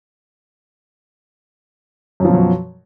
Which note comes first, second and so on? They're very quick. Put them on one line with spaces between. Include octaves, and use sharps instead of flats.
F#2 F3 B2 F#3